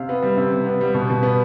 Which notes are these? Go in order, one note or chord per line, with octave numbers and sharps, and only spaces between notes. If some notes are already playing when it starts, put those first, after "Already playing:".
Already playing: C3 F5
B3
G3
C3
C3
B3
G3
B2
B2
B3